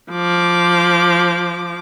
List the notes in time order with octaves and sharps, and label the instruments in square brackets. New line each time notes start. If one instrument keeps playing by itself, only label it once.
[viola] F3 D6